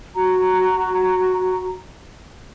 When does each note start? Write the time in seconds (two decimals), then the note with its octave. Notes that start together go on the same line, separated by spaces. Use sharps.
0.15 F#4 A#5